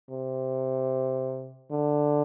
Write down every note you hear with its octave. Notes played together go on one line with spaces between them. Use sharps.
C3
D3